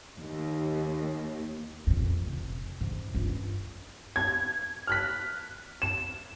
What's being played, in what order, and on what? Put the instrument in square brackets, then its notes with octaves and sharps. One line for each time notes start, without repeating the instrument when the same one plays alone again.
[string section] D#2
[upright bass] F2 A#2
F1
G#2
G2 F4
[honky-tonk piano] G#6
F6 F#6 B6
E7